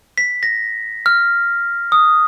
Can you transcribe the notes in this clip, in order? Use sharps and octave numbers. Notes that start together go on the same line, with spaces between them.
B6
A#6
F6
D#6